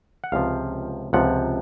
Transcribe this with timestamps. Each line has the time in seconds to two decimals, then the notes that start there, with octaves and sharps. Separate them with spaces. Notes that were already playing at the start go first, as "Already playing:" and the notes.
0.24 F#5
0.32 C#2 C3 F3 F5
1.13 C#2 C3 F3 F#5